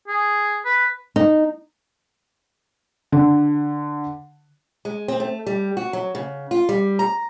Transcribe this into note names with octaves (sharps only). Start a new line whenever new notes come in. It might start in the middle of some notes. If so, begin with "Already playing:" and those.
G#4
B4
D#4
D3
G#3
C4
A3
G3
F#4
F#3
C#3
F4
G3
A#5